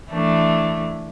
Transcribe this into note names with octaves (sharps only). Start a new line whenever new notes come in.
E3 A3 D4